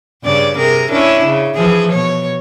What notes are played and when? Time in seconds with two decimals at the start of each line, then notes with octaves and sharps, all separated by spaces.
0.23 G2 C#3 D5
0.57 C3 G#4 A#4
0.91 C#4 D4 E4
1.25 C#3
1.55 E3 F3 G#4
1.91 B2 C#5